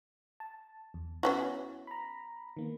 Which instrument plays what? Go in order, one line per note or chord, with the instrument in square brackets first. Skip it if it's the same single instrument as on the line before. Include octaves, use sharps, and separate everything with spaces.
[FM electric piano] A5
E2
[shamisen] B3 C#4 F#4 [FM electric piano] E4
[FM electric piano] A#5 B5
D#3 A#3 B3